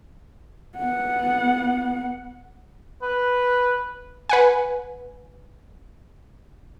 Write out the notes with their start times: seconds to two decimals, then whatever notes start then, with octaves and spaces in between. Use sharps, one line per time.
0.77 B3 F#5
3.03 B4
4.29 B4 F#5 G#5